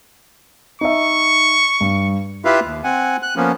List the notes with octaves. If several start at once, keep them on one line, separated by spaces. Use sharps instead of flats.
D#4 E5 C#6
G2
E4 F4 G4 B4 E5 F5
D#2
C4 F#5 G#5
F#6
F3 A#3 B3 C#4